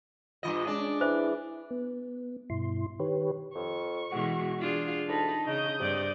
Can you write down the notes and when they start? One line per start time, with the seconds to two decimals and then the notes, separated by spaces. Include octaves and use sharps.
0.43 G2 F#3 F4 D#5
0.67 G#3 C#4 D4 D5
1.01 E3 E4 C5
1.71 B3
2.50 G2 B2 E4 C6
3.00 D#3 G4 B4 C#5
3.55 F2 C#6
4.12 B2 E3 G#3 F#4
4.59 D4 F4 G#4
5.08 D2 D#4 A5 B5
5.47 C#3 D#4 D#6 G6
5.80 G2 C3 D5